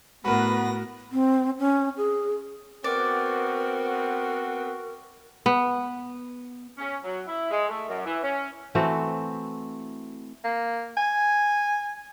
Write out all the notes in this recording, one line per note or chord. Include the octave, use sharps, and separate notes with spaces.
A2 B3 F#4 A#4 B4 A#6
C4
C#4
G#4
B3 C4 F#4 A#4 D5
B3
C#4
F#3
E4
G#3
A3
F#2
E3
C#4
E3 A3 C4 F#4
A#3
G#5